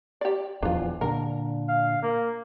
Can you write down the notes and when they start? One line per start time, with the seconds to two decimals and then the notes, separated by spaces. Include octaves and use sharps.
0.21 G4 D5
0.62 D#1 E2 F3 D4 F4
1.01 A#2 D3 A#4
1.69 F5
2.02 A#3